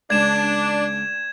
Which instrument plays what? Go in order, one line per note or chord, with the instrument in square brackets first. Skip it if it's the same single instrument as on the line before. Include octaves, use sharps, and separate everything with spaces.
[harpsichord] C#2 [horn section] D4 [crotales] G#6 E7